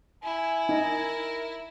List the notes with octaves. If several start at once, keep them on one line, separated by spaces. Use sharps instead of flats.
E4 G#5
D#4 A#4